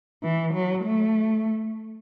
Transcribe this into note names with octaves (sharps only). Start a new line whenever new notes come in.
E3
F#3
A3